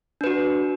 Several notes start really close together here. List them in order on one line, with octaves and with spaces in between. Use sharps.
D4 B4 F#4